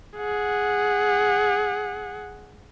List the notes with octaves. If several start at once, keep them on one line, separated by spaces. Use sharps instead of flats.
G#4 F#5